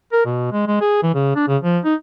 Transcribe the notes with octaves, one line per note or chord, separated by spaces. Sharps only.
A#4
B2
G#3
G#3
G#4
E3
C#3
D4
C#3
F3
D#4